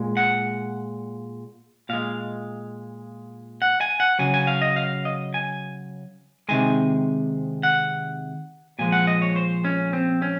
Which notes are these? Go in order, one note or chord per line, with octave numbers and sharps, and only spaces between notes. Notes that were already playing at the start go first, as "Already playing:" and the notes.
Already playing: A#2 G#3
F#5
A#2 G#3 F5
F#5
G#5
F#5
C#3 F#3 G#5
G#5
F5
D#5
F5
D#5
G#5
C3 D#3 G#3 G#5
F#5
A#2 F3 G#3 G#5
F#5
D#5
C#5
C5
C#4
C4
C#4